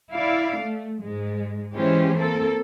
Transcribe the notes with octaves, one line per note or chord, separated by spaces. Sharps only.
E4 D5 F5
A3
G#2 G#3
E3 G#3 C#4 G4 C5
A#3 C4 A4